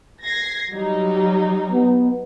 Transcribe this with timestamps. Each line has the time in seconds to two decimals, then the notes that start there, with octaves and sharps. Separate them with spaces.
0.23 G#6 A#6 C7
0.74 F#3 G3 D#4
1.72 B3